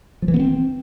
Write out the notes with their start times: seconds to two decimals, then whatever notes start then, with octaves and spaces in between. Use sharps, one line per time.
0.22 F3
0.28 E3
0.34 B3
0.40 C4